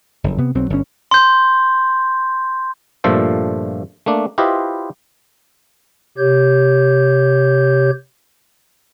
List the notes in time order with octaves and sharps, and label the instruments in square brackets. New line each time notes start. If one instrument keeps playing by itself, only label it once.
[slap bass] F#1 F2
C3 B3
B1 F#3 C4
G1 A#2 C#4
[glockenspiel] C6 G6
[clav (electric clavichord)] G2 A#2 F3 A3 A4 C5
A3 A#3 D4
E4 F4 G4 B4 C5 D#5
[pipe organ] C3 G4 C#5 G6